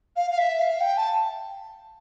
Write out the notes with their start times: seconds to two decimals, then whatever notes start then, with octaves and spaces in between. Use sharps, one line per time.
0.16 F5
0.31 F5
0.38 E5
0.59 F5
0.81 G5
0.97 A5